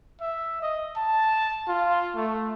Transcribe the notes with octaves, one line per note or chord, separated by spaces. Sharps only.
E5
D#5
A5
F4
A3